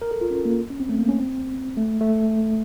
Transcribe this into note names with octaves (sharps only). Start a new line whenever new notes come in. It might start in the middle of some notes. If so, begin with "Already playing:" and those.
A#4
A4
F4
C#4
A#3
C#4
C4
A3
A#3
C#4
C4
A3
A3